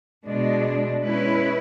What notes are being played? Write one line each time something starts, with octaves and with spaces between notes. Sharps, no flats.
B2 G#3 D4
G#3 C#4 E4 B4